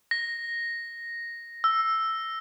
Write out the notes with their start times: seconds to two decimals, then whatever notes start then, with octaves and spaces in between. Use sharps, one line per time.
0.11 A#6
1.64 E6